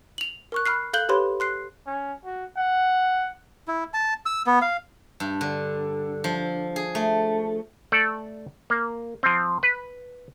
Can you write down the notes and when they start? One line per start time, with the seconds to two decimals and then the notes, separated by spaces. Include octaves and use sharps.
0.18 F7 F#7
0.52 A#4 C#6 F#6
0.66 B5 F6 F#6 C7
0.93 A4 F5 F#6 G6 F#7 G7
1.09 G4 A4 B4 C#5 B5 C6
1.40 C6 F#6 C7
1.86 C#4
2.25 F#4
2.57 F#5
3.68 E4
3.94 A5
4.26 E6
4.47 B3
4.62 F5
5.20 G2
5.41 D3
6.24 F3
6.76 G#4
6.95 A3
7.92 A3 A4 D5
8.70 A#3
9.23 F3 C4
9.63 B4